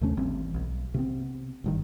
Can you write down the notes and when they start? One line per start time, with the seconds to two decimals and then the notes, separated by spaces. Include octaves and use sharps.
0.01 D#2 C3 A3 C#4
0.17 G#1 E3 G3 C4
0.54 B1
0.94 C3 B3 C4
1.64 F#1 G2 D#3